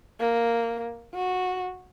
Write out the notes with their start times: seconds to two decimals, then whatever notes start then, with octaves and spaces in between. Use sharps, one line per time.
0.20 A#3
1.14 F#4